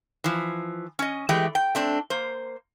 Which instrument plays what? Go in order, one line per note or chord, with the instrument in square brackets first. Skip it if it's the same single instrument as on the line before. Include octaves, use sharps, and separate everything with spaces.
[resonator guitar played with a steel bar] E3 F3
C#4 D#5
E3 G#3 A3 G4 G5
G5
A3 C4 D4
A#3 C5